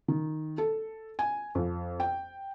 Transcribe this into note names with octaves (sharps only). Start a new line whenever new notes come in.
D#3
A4
G#5
F2
G5